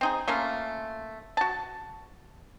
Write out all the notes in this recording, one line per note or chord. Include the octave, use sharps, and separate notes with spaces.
C4 D#4 G#4
A3 A#3 C#4 F4
F#4 A5